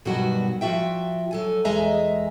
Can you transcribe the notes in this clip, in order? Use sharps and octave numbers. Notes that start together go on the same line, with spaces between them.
G2 B2 D#3 F#3 F#4
F3 F4 F#4 E5 G5
F#3 A4 G#5
E2 G#3 D#5 E5 G#5 A#5